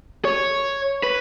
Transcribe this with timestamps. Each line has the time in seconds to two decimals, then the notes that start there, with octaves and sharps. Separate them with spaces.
0.25 C#5
1.03 B4